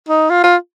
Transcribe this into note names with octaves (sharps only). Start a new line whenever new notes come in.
D#4
F4
F4